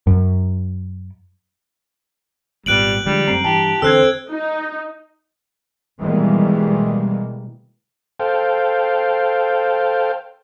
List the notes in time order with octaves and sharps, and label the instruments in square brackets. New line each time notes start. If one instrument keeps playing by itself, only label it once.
[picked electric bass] F#2
[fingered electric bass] G#1 A#2 B3 [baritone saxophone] G3 [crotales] F#6 D7 F#7
[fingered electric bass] D3 F3 G#3 [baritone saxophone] G3
[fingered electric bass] F#2 A3 C4 [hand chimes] A#5 C7
[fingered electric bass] G2 E3 [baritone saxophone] G4 [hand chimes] A5
[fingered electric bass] E2 D3 [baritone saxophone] C4 [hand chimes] A4 C5 [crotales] E6 F#6 G#6
[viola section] D#4
[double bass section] B2 D#3 E3 G3 G#3 A#3
[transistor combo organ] A4 C5 F5 G5